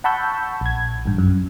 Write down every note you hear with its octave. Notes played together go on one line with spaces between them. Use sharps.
F#5 A5 B5 C#6 E6 G6
A#1 G#6
A1 G2
F#2